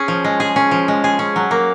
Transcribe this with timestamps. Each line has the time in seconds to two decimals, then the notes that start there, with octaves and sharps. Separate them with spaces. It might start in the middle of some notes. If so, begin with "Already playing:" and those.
Already playing: C#4 G#4
0.08 F3
0.24 G#3
0.40 G#4
0.56 C#4
0.71 F3
0.88 G#3
1.04 G#4
1.19 C#4
1.36 F#3
1.51 A#3